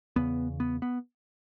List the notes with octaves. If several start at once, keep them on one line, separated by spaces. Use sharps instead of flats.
E2 C#3 B3
B3
B3